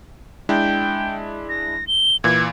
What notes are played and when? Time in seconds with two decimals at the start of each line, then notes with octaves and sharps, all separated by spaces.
0.49 G#3 D4 E4 G5
1.49 A#6
1.87 G7
2.24 A#2 E3 G#6